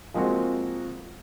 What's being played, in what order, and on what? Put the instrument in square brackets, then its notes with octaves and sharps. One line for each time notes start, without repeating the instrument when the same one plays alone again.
[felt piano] F3 G#3 A#3 C4 F#4